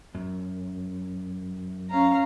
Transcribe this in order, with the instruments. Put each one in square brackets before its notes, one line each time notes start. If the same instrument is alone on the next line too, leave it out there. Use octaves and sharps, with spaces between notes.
[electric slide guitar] F#2
[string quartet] C#4 F5 A#5